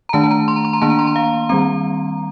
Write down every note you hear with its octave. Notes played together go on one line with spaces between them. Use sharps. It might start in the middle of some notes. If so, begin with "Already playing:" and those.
A#5
D#3 A3 D4 A5
A5
A#5
C6
A#5
C6
A#5
D#3 A#3 D4 A5
A#5
C6
A#5
F5
D#3 G3 C4 A#5